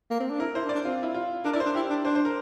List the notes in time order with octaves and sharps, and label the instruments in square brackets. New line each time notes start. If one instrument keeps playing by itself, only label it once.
[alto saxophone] A#3
C4
D4
[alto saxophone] E4 [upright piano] A#4
[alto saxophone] E4 [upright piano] C5
[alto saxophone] D4
[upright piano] D5
[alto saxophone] D4
[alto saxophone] C4 [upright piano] F4
[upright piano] E4
F4
[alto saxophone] D4 [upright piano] A#4
[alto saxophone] E4 [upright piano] D5
[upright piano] C5
[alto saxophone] D4
[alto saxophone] E4 [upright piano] G4
[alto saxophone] D4
[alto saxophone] D4 [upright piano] C5
[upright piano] C5
A#4